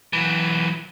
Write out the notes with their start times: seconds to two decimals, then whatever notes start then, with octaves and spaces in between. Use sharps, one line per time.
0.13 E3 F#3